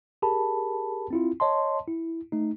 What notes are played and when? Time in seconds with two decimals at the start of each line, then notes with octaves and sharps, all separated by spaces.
0.22 G4 G#4 A#4 A5 B5
1.11 C4 E4 F4
1.40 C#5 D#5 A5 C6
1.87 E4
2.32 A3 D#4